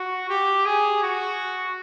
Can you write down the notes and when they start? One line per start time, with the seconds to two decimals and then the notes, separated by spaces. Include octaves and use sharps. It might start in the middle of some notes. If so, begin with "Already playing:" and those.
Already playing: F#4
0.29 G4
0.66 G#4
1.03 F#4